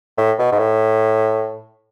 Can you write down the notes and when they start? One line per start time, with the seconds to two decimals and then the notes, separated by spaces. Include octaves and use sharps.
0.17 A2
0.39 B2
0.52 G#2
0.59 A2